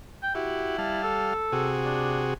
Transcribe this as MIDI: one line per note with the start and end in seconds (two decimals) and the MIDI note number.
0.23 0.33 79
0.35 1.00 64
0.35 0.77 66
0.35 0.77 67
0.78 1.34 55
0.78 1.34 77
0.78 1.34 81
1.03 1.74 69
1.52 2.34 48
1.52 2.34 66
1.52 2.34 68
1.85 2.22 62